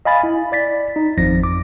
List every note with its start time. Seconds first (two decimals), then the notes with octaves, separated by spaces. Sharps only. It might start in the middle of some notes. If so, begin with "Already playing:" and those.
0.05 D#5 F5 G#5 B5 A6
0.24 E4
0.52 D5 A6 B6
0.96 D#4
1.18 G#1 F2 F3 A#6
1.43 D6